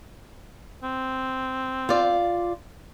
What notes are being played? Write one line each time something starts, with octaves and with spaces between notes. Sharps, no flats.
C4
F4 D5